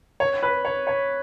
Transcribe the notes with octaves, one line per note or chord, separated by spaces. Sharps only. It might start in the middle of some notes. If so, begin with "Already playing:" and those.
C#5
B4
C#5
C#5